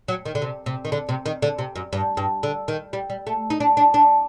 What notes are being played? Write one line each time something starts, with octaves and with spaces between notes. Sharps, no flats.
F#3
D#3
D3
C3
C3
D#3
D3
C3
D#3
D3
C3
F#2
G2
G2
D3
D#3
G3
G3
A3
D#4
D4
D4
D4